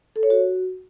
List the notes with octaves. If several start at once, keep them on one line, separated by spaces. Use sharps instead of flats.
A4
C#5
F#4